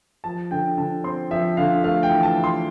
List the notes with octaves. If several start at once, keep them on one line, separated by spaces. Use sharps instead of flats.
F3 A5
D3 G5
D3 A5
C4 C6
F3 E5
D3 F5
A3 F5
G5
E3
A5
E3
C6